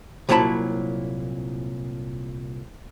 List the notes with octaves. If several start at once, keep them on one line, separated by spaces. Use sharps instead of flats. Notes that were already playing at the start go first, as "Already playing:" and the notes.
C2 A#2 F#3 E4 A5 B5